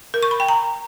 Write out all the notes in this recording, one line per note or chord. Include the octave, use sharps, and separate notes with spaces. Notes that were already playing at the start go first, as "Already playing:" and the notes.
A#4
C#6
B5
G5
A#5